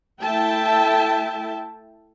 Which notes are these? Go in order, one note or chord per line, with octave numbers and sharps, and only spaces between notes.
A3 E4 E5 G5 A5